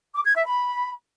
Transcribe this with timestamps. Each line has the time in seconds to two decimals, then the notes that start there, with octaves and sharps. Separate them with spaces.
0.15 D6
0.25 G#6
0.36 E5
0.46 B5